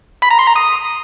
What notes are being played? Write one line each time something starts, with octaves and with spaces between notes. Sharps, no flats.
B5
A#5
C6
A#5
D#6